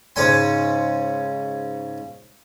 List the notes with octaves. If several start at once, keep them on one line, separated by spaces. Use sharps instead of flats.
G#2 C#3 C#4 C#5 G#5 C6